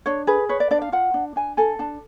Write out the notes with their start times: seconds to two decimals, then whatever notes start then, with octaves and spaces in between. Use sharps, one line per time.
0.06 D4 C#5
0.27 G#4 B4
0.49 B4 C#5
0.60 D5
0.71 D4 D5
0.82 F5
0.92 F4 F#5
1.14 D4
1.36 D4 G#5
1.57 A4 G#5
1.79 D4 A5